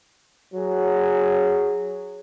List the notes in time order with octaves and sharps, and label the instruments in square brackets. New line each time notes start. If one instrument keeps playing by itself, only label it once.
[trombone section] F#3 G#4